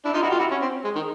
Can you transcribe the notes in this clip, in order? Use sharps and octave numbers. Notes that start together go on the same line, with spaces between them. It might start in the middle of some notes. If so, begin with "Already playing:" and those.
D4 E4
D#4 F4
E4 F#4
F4 G4
E4 F#4
C#4
C4
G#3
D#3